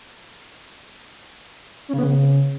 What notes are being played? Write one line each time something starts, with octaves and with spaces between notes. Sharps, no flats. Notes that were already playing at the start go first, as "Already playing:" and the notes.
C#4
C#3
B3
C#3